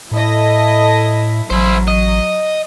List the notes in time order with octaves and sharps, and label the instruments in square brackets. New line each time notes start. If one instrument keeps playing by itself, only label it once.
[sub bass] A2 [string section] E4 A4 D#5
[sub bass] A1 [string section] F#3 [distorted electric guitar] E4 C5
[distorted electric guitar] D#5